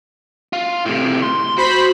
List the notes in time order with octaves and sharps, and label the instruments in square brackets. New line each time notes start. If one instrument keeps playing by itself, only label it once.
[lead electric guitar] F4
A2 C3
C6
[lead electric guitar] F#4 [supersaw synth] C5 B5 B6